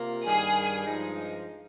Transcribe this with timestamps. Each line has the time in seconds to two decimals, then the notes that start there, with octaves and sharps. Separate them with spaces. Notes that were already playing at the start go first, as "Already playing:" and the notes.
Already playing: C3 A#3 F4
0.26 G2 D#3 G3 G#4
0.85 G2 F3 G#3 D#4